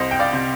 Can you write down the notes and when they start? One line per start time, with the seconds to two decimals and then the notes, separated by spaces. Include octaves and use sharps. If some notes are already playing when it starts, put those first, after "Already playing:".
Already playing: C2 C5 D#5
0.11 G5
0.19 D5 F5
0.33 C3